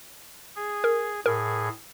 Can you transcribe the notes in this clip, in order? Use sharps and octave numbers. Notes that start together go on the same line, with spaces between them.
G#4
A#4
A2 G#4 A#4